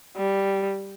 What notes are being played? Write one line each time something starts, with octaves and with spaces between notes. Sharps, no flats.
G3